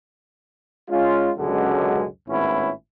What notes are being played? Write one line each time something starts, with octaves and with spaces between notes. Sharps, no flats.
G#3 C#4 F4
C#2 F#2 B2 D3 G#3
G#1 A2 B3 C#4 E4